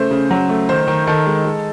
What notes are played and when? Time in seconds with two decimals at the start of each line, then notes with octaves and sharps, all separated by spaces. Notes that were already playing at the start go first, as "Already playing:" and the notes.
Already playing: C#3 A3 C5
0.11 C#3
0.31 F#3
0.49 A3
0.69 D#3 C5
0.87 D#3
1.07 D#3 A4
1.27 G#3
1.45 G#3